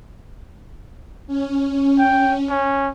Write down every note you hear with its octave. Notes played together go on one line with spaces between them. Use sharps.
C#4
G5
C#4